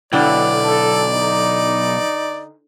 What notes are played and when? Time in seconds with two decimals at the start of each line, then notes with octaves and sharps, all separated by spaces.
0.12 B1 D3 E4 D5 G5
0.64 A4
1.13 D#4